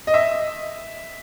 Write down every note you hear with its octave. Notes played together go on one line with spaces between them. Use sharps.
D#5
E5